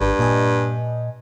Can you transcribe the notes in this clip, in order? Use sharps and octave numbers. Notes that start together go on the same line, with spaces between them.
G#1 G2
A#2 D#5 G#5